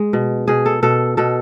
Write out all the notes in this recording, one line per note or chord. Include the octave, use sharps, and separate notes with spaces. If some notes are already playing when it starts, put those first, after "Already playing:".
Already playing: G#3
B2
B2 G#4
A4
B2 A4
B2 A4